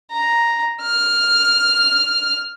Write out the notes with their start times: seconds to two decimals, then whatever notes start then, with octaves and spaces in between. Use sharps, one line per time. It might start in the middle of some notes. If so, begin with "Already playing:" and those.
0.11 A#5
0.82 F6